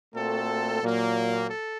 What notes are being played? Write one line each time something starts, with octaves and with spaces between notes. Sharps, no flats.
A#2 A3 C4 F#4 A4
A#2 F#3 A#3
A4